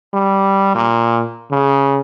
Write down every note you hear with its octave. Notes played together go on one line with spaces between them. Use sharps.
G3
A#2
C#3